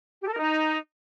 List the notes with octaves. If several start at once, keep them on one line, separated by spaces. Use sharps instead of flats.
G4
A4
A#4
D#4